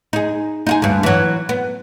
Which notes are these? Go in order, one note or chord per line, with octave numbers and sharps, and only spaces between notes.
D#4 G#4
D#4 F4 G#4
D2 G2
E3 F#3
B3